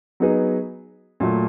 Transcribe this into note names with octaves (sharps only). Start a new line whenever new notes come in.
F#3 B3 D#4 G#4 B4
A#2 F#3 A3